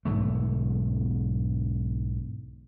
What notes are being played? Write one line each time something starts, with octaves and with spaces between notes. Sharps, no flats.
B1 G#2 D3 A3